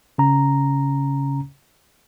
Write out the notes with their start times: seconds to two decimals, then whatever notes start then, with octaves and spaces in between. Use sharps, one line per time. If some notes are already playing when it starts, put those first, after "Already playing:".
0.18 C#3 C#4 A#5